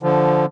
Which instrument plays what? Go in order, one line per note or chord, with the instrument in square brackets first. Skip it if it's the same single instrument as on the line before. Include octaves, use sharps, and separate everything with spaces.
[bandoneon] D3 F3